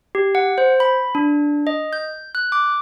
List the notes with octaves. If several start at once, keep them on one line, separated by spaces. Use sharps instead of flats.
G4
F#5
C5
B5
D4
D#5
G6
F#6
D6